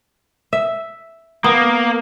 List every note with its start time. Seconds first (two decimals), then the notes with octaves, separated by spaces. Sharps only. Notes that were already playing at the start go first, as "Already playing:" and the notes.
0.53 E5
1.44 A#3 B3